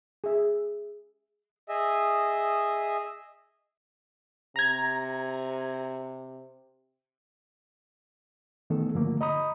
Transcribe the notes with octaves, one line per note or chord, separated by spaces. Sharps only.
G#4 E5
G#4 D#5 E5
C3 A#5 G#6
D#3 E3 A3 B3 A4
G2 D3 F3 A3 A#3
D#5 A#5 B5 D#6